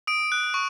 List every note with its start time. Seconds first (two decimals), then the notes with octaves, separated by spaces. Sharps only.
0.07 D#6 D7
0.32 F#6
0.54 C#6